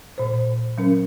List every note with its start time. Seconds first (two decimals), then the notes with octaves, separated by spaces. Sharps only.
0.18 A#2 C5
0.78 F#3 C#4 A#4